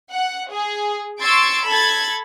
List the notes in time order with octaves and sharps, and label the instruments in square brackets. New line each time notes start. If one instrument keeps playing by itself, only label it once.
[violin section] F#5
G#4
C6 C#6 E6 G#6 A6 D7
A4 B5 G#6 A6